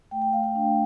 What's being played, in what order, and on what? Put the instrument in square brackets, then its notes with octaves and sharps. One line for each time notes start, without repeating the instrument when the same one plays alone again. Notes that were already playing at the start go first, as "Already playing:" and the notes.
[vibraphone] A3 G5
G5
A3 F5
G5
D4